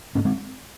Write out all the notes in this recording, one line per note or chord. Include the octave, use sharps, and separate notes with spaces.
G#2 A#3 C#4
G#3 C4